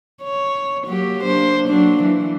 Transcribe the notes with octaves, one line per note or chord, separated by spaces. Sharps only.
C#5
F#3 A#3 G4
A#3 D4 C5
F#3 A#3 D4
E3